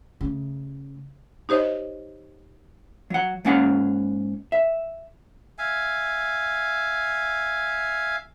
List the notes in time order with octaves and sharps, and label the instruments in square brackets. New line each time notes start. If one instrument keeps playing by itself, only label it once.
[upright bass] C#3 A3
[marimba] D#4 G4 C5 C#5 D#5
[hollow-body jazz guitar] F#3 F#5
G#2 A#3 C#4 F5 F#5
E5
[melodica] E5 F5 G#5